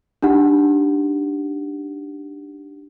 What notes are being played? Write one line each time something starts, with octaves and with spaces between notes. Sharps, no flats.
D4 D#4 G4 F#5